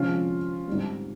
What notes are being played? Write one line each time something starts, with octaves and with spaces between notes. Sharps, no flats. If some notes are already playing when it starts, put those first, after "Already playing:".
Already playing: C3 F3 G#3 C#4 F4
G#2 G3